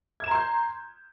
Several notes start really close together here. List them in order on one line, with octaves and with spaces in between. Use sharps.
G#6 E7 A#5 C6 G6